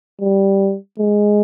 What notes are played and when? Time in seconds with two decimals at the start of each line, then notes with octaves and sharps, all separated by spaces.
0.21 G3
0.99 G#3